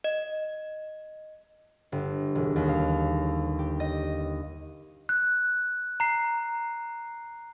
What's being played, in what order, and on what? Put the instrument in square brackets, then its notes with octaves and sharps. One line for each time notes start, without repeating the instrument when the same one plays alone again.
[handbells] D#5
[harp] G1
E1
D#2
F5
G4
D#5
[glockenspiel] F#6
A#5 C7